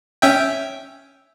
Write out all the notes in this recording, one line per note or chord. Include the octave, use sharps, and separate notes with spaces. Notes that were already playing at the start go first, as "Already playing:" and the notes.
C#4 E5 G5